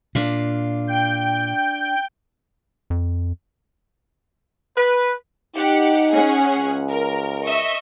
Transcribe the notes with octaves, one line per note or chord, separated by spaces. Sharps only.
A#2 D4 F4 F5
G5 G6
F2
B4
D#4 G4 F#5
C#4 G#4 F#5
C#2
A#4
D#5 E5 C#6